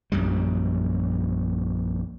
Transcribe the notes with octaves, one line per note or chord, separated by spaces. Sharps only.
A#1 F#2 G3